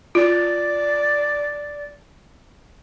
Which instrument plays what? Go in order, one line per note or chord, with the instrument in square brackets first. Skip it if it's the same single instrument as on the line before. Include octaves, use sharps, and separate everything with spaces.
[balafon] F4 [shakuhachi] D5